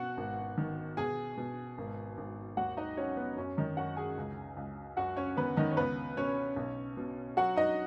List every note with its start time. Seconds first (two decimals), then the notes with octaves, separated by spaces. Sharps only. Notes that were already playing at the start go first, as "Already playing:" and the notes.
Already playing: B2 F#4 F#5
0.17 G#1
0.57 D#3
0.97 B2 G#4 G#5
1.37 B2
1.78 G#1
2.18 G#1
2.57 D#2 F#4 F#5
2.77 D#4 D#5
2.97 F#3 C#4 C#5
3.17 B3
3.37 F#2 C#4
3.57 D#3 D#4
3.77 F#2 F#4 F#5
3.97 G#4 G#5
4.18 C#2
4.57 C#2
4.97 F#2 F#4 F#5
5.17 C#4 C#5
5.37 D#3 B3 B4
5.57 D#3 D#4
5.71 C#5
5.77 C#2 B3 B4
6.17 B2 C#4 C#5
6.56 B1
6.97 B2
7.37 F#3 F#4 F#5
7.56 D#4 D#5